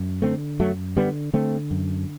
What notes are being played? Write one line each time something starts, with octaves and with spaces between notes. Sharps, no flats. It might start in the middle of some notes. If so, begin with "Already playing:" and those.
Already playing: F#2
D3 A3 C4
F#2 F#3 A3
D3 G3 B3
D3 A3 C4
F#2